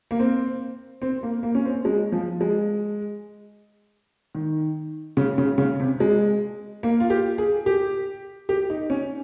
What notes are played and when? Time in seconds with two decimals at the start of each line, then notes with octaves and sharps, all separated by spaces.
0.11 A#3
0.19 C4
1.02 C4
1.23 A#3
1.43 A#3
1.55 C#4
1.65 C4
1.85 G#3
2.12 F3
2.41 G#3
4.35 D#3
5.17 C#3
5.38 C#3
5.58 C#3
5.80 C3
6.00 G#3
6.83 A#3
7.00 F4
7.10 G4
7.38 G#4
7.66 G4
8.49 G4
8.70 D#4
8.90 C#4